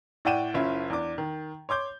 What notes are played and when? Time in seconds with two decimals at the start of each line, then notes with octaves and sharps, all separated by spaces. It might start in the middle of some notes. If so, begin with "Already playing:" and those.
0.25 A2 D5 F#5 G5 D#7 E7
0.54 F#1 C#4 E4 F4
0.90 E2 D4 D6
1.18 D#3
1.69 C#5 C6 D6 G6